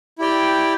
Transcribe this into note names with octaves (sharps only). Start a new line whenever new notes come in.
E4 G4 D5 G5